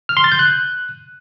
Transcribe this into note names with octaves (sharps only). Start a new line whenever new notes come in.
F6
C6
A6
G6
F#6